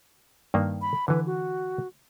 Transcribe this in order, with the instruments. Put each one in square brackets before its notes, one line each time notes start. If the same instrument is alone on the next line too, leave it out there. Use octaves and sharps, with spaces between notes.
[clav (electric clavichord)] G2 D#3 A#3
[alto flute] B5
[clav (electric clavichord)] D3 E3 [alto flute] B4
[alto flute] F#4